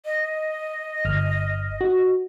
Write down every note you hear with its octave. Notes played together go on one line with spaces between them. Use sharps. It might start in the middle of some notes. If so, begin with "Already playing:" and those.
D#5
G1 F6
F#4